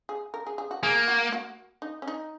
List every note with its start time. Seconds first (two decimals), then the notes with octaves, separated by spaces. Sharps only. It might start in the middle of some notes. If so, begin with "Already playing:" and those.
0.09 G#4
0.34 A#4
0.47 G#4
0.58 G#4
0.71 F#4
0.83 A#3 G#4
1.08 F#4
1.32 F#4
1.82 D#4
2.02 C#4
2.08 D#4